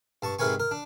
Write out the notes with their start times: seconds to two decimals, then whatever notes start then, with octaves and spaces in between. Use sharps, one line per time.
0.22 G2 A5 C#6
0.39 G#2 C3 A#4 B4 G#5 C#6
0.60 A#4
0.71 D4